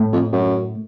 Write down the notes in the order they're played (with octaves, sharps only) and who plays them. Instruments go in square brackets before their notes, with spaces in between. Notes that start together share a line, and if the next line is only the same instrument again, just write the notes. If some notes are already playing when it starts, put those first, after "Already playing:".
Already playing: [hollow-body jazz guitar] A2
[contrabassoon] F2
F#2